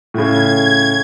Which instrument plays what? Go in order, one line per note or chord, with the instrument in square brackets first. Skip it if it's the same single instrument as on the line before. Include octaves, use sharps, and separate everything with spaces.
[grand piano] A2 C#3 [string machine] G#6